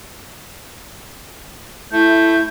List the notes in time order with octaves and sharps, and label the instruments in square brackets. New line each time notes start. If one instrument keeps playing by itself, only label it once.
[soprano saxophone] A3 [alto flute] E4 [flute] G6